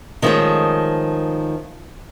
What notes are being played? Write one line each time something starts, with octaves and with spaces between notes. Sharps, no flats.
D#3 F3 G#3 A3 C#4 G#4